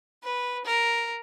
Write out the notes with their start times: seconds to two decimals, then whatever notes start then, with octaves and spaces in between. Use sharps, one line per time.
0.24 B4
0.65 A#4